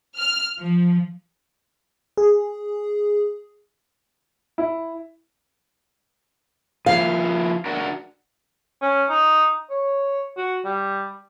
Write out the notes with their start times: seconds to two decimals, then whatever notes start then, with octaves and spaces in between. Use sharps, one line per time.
0.18 F6
0.59 F3
2.17 G#4
4.58 E4
6.86 F3 A#3 E4 F5
7.66 D4 F#4 A#4
8.82 C#4
9.09 D#4
9.70 C#5
10.37 F#4
10.65 G3